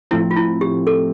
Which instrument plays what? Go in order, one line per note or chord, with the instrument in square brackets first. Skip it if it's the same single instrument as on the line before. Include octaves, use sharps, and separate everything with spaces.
[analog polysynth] A2 F3 A3 C4 [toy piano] E4
[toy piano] F4
E4
G4
A4